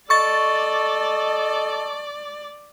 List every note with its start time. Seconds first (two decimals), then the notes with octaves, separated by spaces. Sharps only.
0.10 A4 D5 D#5 C#6 A6